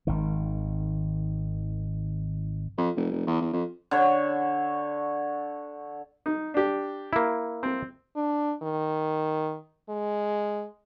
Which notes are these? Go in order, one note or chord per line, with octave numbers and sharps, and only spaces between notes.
G#1 D#3
F2
F1
F1
E2
E2
F2
D3 C#5
D#4
D4 G4
A#3 E4
C4
D4
D#3
G#3